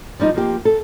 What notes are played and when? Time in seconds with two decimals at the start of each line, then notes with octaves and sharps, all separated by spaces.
0.19 F3 G3 D4 D#4
0.35 F3 A#3 G4
0.65 A4